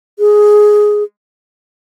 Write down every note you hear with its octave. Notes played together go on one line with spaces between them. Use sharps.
G#4